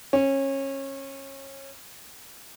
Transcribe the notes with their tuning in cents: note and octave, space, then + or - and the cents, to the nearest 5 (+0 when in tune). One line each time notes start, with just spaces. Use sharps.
C#4 -25